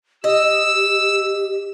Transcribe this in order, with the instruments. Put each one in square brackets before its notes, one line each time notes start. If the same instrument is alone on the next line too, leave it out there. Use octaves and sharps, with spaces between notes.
[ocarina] G4 [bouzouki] D#5 [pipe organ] E6